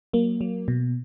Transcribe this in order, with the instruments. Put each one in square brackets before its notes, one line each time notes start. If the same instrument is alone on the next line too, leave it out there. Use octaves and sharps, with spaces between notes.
[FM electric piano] F#3 A#3
F#3
B2